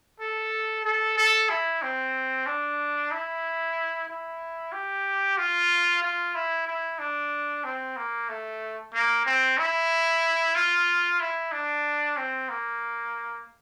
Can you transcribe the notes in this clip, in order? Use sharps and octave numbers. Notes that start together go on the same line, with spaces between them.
A4
A4
A4
E4
C4
D4
E4
E4
G4
F4
F4
E4
E4
D4
C4
A#3
A3
A#3
C4
E4
F4
E4
D4
C4
A#3